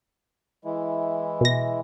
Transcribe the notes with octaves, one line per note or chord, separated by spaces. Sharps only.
E3 G#3 E4
B2 A#6